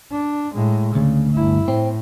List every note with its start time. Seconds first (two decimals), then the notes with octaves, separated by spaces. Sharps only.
0.12 D4
0.54 A2 G#3
0.95 D2 C#3
1.34 G1 E4
1.68 A2 C4